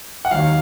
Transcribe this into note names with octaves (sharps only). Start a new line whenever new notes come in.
F#5
D#2 D#3 F#3 F5